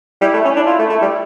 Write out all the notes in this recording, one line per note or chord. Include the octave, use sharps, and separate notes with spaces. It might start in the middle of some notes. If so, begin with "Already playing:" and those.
G3 E4
A3
C#4
D4
F4
A3
A3
G3